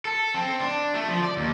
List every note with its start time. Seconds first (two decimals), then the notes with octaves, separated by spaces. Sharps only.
0.05 A4
0.34 C4
0.60 D4
0.94 A3
1.09 F3
1.24 D5
1.37 D#2